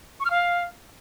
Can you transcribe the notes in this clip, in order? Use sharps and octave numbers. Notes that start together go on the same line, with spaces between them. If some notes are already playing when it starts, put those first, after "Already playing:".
C#6
F6
F5